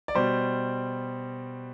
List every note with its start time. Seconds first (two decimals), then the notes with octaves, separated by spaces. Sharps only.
0.08 D5
0.15 B2 G3 C5